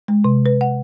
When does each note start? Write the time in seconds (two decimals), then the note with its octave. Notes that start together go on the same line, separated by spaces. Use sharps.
0.08 G#3
0.24 C3
0.46 B4
0.61 F#5